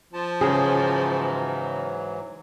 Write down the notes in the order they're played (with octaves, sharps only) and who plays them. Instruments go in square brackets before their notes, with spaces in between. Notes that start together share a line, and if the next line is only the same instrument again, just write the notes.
[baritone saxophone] F3 [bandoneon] A5
[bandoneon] G#2 E3 F#3 [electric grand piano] C#3 C#4 [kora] G#4